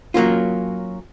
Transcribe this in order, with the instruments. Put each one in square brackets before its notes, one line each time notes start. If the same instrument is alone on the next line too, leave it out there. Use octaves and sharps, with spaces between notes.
[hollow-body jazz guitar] F#3 A#3 C#4 F4